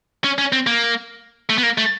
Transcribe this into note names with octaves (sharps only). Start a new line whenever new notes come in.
C#4
C#4
C4
A#3
A3
B3
A#3
A3